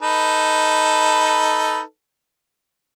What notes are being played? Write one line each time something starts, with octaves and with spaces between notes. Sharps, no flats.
D#4 A4 B4